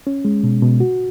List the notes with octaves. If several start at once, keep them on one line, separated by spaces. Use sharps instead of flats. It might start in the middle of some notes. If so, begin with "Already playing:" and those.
C#4
G#3
B2
B2
F#4